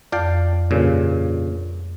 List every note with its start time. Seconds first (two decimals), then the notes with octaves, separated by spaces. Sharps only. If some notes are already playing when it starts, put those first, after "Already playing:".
0.12 F2 D5 F5 G5
0.71 G2 A#2 C#3